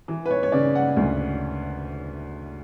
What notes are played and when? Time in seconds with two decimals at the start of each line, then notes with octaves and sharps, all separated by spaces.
0.08 E3
0.26 B4
0.31 C#5
0.43 C#5
0.52 C#3 D5
0.75 F#5
0.97 D2